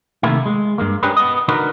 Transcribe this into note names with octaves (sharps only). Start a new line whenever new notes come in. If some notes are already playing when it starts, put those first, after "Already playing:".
C3 D#3 A3 A#3 E4
G#3
G2 G#3 A#3
C#4 D4 G4 G#4 A#4 B4
B3 D#5
D3 D#4 F#4 A#4 B4